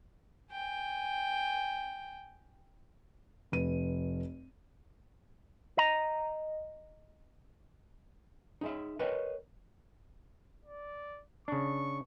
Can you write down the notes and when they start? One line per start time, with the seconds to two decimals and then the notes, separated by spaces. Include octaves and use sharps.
0.52 G5 G#5
3.52 F1 B4 D#7
5.78 D#5 A#5
8.61 D#4 G#4 E5
8.99 A#4 B4 C#5 D#5 G5
10.65 D5
11.48 C#3 D4 C#6